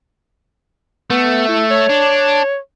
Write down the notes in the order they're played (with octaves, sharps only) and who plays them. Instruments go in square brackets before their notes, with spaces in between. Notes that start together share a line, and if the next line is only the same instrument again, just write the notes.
[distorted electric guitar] A3 [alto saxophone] B3
[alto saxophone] E4
C#5
[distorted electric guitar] D4